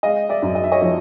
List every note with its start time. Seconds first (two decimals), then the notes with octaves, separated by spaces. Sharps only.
0.03 G#3 D#5 F5
0.29 D5 E5
0.42 F#2
0.55 D#5
0.64 E5
0.72 C#5 D#5
0.82 F3 C#5